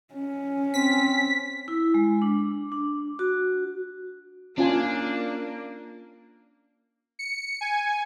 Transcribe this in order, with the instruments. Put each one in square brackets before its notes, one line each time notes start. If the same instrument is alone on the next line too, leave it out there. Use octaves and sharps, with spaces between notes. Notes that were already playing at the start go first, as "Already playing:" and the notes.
[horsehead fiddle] C#4
[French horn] C4 [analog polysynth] B6
[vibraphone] E4
G#3
D4
D4
F#4
[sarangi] A#3 [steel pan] C#4 F4 G#5 [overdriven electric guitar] D4
[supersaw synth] C#7
G#5